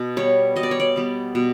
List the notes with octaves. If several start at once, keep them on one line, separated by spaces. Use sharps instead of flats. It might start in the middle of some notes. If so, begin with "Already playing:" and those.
Already playing: B2
G3 B3 C#5
B2 D#5
D5
C#5
D5
G3 B3
B2